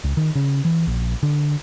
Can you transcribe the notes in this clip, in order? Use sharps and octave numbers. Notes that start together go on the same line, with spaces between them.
C#2
D#3
C#3
E3
A#1
D3